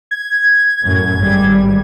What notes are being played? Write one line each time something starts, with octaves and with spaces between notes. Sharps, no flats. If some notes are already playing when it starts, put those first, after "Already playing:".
G#6
F#2 A2
G#1 G3